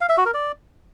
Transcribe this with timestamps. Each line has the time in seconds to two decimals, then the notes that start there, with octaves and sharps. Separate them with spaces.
0.01 F5
0.09 E5
0.17 F#4
0.26 A#4
0.34 D5